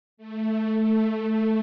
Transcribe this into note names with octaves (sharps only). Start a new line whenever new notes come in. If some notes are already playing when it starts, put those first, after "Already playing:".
A3
A3
A3